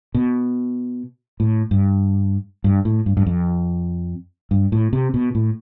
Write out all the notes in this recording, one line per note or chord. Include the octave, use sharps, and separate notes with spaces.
B2
A2
G2
G2
A2
G2
G2
F2
G2
A2
C3
B2
A2